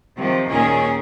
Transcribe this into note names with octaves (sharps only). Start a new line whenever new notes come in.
C3 D#3 F3
D#2 A#2 D#3 C#4 G#4 A#4